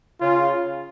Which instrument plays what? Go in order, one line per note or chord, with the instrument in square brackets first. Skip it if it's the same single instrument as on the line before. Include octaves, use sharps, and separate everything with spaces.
[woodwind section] C#3 [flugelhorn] F4